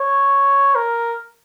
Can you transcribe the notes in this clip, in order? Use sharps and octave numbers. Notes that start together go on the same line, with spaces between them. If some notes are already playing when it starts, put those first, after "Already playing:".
Already playing: C#5
A#4